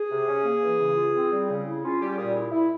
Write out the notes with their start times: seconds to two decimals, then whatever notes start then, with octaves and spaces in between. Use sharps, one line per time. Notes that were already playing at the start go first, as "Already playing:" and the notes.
Already playing: G#4
0.10 C3
0.28 C#4
0.44 A#3
0.62 E3
0.80 C#3
0.96 F4
1.14 C4
1.32 G3
1.49 C#3
1.66 E4
1.83 C#4 F4
2.01 G3 G4
2.17 A#2 G#4
2.35 E4
2.52 E4